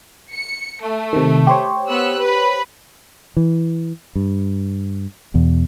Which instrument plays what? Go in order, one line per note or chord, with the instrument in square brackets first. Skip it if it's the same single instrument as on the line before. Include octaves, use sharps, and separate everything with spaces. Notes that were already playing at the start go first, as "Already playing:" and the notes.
[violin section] C#7
A3
[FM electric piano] C3 D#3
G4 C5 C#5
[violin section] B3 E6 F#6
B4 B5
[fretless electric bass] E3
G2
E2 B2